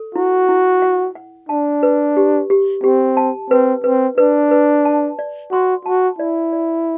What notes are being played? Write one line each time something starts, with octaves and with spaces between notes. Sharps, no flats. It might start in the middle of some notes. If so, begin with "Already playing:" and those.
Already playing: A4
E4 F#4
E4
F#5
F#5
D4 A5
B4
G4
G4
C4 G4
A5
C4 B4
C4 B4
D4 B4
B4
A5
D5
F#4 C6
F#4 A5
E4 D5
D5